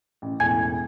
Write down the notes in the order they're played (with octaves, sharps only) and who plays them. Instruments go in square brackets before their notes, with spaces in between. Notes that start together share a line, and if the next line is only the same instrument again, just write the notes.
[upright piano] A1
[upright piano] E1 A2 A4 [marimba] G#5 G#6